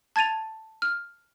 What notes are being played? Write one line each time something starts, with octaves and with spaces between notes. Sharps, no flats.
A5 G#6 A6 D#7 F7
F6